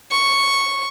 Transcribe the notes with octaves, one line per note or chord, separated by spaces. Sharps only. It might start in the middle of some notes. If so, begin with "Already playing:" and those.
C#6